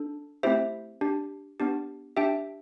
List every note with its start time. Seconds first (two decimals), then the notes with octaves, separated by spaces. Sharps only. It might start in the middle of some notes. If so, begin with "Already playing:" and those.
Already playing: D4 A4
0.43 A3 C4 E4 G4 C5 E5
1.01 D4 G4
1.60 B3 D4 G4
2.17 D4 G4 E5 G5